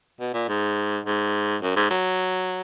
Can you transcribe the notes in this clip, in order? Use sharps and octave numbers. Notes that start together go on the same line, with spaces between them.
B2
A#2
G#2
G#2
F#2
G#2
F#3